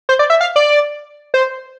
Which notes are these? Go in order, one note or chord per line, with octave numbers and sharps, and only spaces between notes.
C5
D5
E5
F5
D5
C5